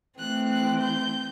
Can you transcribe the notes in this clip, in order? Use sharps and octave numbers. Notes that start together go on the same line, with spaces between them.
E3 A3 C4 F#6
F#6
G6